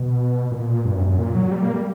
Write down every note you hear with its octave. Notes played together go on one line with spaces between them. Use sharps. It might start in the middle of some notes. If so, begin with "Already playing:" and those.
Already playing: B2
A#2
G2
F#2
F#2
A#2
F#3
G3
A#3
G3